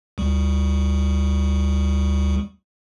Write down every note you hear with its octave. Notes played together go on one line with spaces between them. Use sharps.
D2 G3